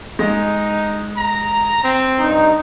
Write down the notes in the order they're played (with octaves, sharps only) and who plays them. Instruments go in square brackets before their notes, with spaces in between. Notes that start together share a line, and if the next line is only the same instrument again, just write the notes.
[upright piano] G#3 D#5 [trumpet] D#4
[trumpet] A#5
C4
[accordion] G2 D#4